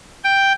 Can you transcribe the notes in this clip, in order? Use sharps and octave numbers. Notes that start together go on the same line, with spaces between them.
G5